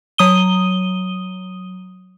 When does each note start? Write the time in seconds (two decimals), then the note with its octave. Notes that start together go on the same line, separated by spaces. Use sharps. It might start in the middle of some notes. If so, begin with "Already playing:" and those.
0.18 F#3 D#6 D#7 G7